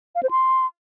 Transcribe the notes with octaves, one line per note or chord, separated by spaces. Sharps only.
F5
C5
C6